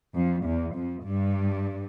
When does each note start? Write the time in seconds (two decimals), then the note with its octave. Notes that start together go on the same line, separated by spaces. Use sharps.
0.15 F2
0.45 E2
0.75 F2
1.05 G2